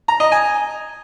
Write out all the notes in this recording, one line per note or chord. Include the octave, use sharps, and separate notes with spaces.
A#5
D#5
G#5